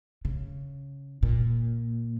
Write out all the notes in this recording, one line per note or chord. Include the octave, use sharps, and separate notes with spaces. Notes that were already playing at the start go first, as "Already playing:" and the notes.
C#3
A#2